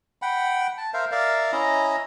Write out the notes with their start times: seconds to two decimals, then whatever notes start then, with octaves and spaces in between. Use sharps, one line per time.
0.22 F#5 G5 B5
0.77 A5
0.94 A#4 C5 E5 F5
1.11 A#4 D5 E5 F5
1.52 C#4 E4 D#5 A#5